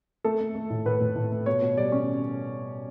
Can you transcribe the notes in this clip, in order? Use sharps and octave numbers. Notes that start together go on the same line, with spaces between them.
A3 A4
A3
A3
A2
A2 B4
A2
A2
A3
B2 C#5
B2
G3 D5
C#4